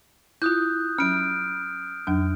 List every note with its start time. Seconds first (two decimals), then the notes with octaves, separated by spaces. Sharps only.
0.42 E4 F4 D#6 F#6 G6
0.98 F#3 C#4 F6 D7
2.07 F2 F#3 D4